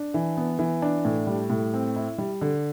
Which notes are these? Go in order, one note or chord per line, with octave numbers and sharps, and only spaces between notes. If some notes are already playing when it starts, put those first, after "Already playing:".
Already playing: D4
E3
B3
E3
D4
A2
G3
A2
C4
E4
G3
D3